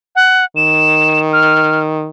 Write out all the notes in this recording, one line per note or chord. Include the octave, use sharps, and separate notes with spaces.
F#5
D#3 E7
F6